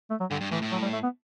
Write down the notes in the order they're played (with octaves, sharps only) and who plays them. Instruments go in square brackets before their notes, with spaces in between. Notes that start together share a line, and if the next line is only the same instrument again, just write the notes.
[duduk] A3
F#3
[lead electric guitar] G2 [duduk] D3
[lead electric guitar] G2
[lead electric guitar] A2 [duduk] E3
[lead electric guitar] A2
[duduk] F#3
G3
A3
B3